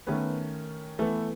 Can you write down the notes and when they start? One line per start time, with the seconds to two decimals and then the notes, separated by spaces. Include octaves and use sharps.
0.07 D#3 A3 B3 C#4 B4
0.99 E3 A3 B3 A4